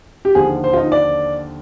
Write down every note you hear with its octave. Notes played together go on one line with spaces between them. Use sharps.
G4
D#2 D3 F3 G#4
C5
F4
D#4
D5